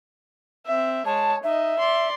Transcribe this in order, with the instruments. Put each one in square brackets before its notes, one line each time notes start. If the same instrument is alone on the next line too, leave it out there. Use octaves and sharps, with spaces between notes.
[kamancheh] C4 E5
[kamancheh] G#3 C#5 [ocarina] A5
[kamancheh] D#4 D#5 [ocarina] E5
[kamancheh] D5 C6